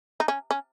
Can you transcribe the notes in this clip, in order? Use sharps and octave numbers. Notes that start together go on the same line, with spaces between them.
D#4
C#4
C#4